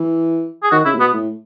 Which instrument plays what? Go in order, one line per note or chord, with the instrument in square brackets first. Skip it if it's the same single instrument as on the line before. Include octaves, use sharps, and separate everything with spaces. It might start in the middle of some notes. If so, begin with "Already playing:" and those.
Already playing: [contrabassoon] E3
[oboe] G#4
[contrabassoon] D#3 [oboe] F#4
[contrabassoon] C#3 [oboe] E4
[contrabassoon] A2
[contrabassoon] B2 [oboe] B3
[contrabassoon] A2